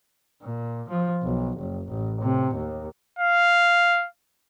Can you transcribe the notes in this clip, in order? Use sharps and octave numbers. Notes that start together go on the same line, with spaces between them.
A#2
F3
B1
F#1
A1
C3
D#2
F5